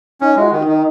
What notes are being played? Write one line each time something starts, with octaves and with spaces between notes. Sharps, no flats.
C#4 D#4
G#3 E4
F#4
D#3
D#4
D#3